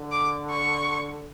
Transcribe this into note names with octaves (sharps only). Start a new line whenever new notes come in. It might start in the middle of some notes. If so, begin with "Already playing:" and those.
Already playing: D3
D6
C#6